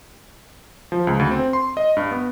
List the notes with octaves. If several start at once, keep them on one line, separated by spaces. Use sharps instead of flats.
F3
C#2
D2
C4
C6
D#5
G2
B3